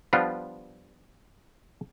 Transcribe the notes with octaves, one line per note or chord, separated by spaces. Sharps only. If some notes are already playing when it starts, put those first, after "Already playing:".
F3 G3 B3 D4 F4